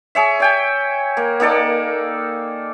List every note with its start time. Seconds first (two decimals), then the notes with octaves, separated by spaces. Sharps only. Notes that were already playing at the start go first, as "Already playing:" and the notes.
0.15 G#4 C#5 E5
0.40 C#5 G5 G#5
1.17 A#3
1.40 A#3 D#4 A4 D5